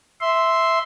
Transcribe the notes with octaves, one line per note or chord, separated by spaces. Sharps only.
E5 C6